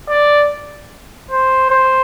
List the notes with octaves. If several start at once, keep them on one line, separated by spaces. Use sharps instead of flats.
D5
C5
C5